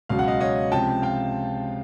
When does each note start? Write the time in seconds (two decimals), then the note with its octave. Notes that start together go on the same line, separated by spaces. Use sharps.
0.09 C#2 B2 F#3 F5
0.19 F#5
0.28 D#5 F5
0.41 C#5 D#5
0.72 C#2 C3 F3 G5 A5
1.02 F5 G5